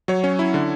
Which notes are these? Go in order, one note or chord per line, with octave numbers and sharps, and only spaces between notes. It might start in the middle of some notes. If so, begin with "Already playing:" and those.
F#3 C#5
C#4
E4
D3